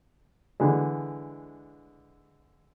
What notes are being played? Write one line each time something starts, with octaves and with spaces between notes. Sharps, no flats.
D3 E3 G#3